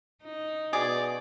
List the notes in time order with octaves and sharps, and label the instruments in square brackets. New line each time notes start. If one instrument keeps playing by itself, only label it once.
[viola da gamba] D#4
[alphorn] B2 [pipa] G#4 [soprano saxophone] D5